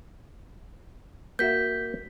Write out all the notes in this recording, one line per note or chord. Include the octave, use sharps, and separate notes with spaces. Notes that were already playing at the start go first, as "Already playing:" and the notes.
A#3 F#4 E5 G6 B6